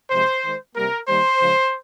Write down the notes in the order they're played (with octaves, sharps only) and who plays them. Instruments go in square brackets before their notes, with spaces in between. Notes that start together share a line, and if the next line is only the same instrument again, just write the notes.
[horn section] C3 F3 G#3 C5
D#3 G#3
C3 G3 A#3 A#4
D#3 G3 A#3 C5
C#3 F3 G#3